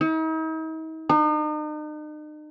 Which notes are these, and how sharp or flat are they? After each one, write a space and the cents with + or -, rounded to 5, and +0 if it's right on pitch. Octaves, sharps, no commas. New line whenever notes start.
D#4 +45
D#4 -40